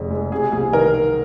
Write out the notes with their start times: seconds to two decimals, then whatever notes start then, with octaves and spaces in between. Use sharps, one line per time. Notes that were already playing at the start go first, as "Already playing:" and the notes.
Already playing: F1 F2 C#3
0.10 G#3
0.32 C3 G#4
0.52 C2 G#4
0.73 D#3 A#4